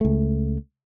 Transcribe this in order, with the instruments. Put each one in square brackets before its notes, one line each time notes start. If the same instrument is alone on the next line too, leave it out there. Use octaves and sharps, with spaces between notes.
[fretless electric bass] C#2 A3